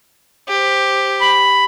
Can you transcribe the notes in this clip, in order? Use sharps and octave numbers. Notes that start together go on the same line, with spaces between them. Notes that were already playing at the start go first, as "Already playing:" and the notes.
G4 C5
B5